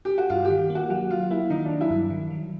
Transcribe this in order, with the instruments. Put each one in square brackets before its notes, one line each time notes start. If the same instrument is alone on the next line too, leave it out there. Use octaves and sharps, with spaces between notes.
[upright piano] G4
F#4
[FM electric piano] G2 [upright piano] F4
[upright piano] G4
[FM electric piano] D#3
A#3
[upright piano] F#4
[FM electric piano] F#3 [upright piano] F#4
[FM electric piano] F#3 [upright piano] F4
[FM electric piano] A#3 [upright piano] E4
[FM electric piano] D#3 [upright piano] D#4
[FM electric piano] F#3 [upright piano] D4
[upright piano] E4
[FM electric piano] G2
D#3
F#3